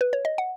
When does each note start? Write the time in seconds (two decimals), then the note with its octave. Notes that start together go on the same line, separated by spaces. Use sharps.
0.01 B4
0.13 C#5
0.25 D#5
0.38 F#5